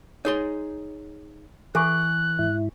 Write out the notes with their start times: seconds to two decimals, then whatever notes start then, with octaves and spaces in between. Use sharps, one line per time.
0.25 D#4 G#4 C#5 C6
1.75 E3 A4 G#5 C#6 F#6
2.39 G#2 E4